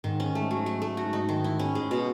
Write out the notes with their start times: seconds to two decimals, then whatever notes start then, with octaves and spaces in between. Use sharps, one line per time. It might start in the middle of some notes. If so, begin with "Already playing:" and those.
0.04 G#2 D#3
0.20 C#4
0.35 A3
0.51 F#3
0.66 A3
0.82 A3
0.97 F#4
1.13 D#4
1.29 D#3
1.44 E4
1.59 C#4
1.75 G#3
1.91 B2